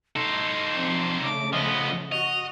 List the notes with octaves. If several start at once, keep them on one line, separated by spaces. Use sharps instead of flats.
D#4 A4 C6
F3 C4 D4
C#3 A3 D6
F3 B3 D#5
F#4 D#5 F7